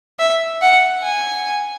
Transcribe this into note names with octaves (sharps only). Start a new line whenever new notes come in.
E5
F#5
G#5